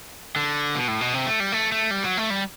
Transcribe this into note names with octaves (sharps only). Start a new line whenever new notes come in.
D3
B2
A2
B2
C3
A3
G3
A3
A3
G3
F#3
A3
G3